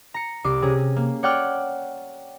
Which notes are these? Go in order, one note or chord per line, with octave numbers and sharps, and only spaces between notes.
A#5 C#7
C2 D6 C7
C3 C#4 G#4
A#3
C#5 D5 F#5 G5 D6 F6